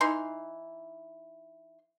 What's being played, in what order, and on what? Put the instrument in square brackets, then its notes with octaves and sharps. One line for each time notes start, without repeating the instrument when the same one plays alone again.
[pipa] E3 D#4 C6